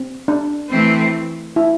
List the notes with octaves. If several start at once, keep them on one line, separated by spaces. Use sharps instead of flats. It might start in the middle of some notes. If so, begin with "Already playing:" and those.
Already playing: C4
D4
E3 A3 C4
E4